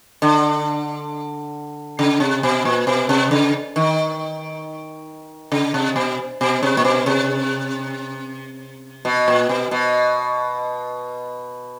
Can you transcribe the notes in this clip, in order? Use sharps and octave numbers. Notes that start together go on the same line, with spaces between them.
D3
C#3
C3
B2
A#2
B2
C3
C#3
D#3
C#3
C3
B2
B2
C3
A#2
B2
C3
B2
A#2
B2
B2